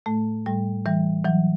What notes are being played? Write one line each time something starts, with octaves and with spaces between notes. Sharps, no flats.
A2 A3
A2 G3
E3 G3
E3 F#3